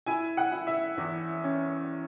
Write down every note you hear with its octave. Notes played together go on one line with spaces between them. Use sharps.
E4 G#5
F#5
E4
E5
E2
C#4